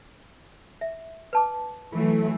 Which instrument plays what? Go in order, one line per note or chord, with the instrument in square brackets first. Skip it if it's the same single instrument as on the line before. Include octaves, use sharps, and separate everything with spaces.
[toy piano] E5
B4 A5 D6
[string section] E3 F#3 A3 [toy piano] F4